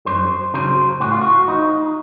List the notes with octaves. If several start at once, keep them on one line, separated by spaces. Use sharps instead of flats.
F#2 C5
C#3 F#3 C5
A2 F#4
F4
F#4
F3 D#4